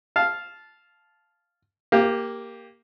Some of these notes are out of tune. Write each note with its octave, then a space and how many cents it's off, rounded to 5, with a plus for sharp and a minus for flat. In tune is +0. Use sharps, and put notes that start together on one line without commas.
F5 +0 A5 -15
A#3 +0 G4 +10